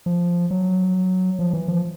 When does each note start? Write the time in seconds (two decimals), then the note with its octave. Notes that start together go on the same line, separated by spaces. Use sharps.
0.06 F3
0.51 F#3
1.39 F3
1.53 E3
1.68 F3